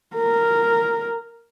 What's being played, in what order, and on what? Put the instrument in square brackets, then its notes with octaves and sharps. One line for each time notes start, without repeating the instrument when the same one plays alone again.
[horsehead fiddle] A#4